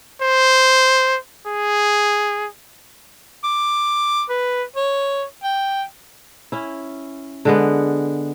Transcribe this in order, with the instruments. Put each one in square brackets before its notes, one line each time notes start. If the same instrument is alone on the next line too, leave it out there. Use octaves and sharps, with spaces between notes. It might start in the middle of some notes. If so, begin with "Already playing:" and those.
[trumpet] C5
G#4
[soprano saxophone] D6
B4
C#5
G5
[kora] C#4 E4
D3 G#3 B3